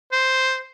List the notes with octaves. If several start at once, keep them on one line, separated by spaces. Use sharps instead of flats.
C5